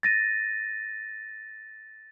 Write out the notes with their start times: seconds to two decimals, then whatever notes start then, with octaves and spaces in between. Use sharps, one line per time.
0.03 A6 A#6 D#7